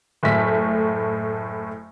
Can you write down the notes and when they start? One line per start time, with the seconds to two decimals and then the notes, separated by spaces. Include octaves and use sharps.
0.23 F#1 A2 A3 B6